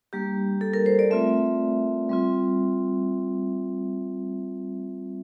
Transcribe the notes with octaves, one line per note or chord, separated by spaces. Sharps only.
G3 A#3 D4 G4
A4
A#4
C5
D5
A3 C4 F4 E5
G3 C4 F4